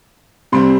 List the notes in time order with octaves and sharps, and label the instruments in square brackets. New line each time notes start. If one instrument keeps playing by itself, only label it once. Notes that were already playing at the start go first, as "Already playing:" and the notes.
[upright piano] C3 G3 C4 C6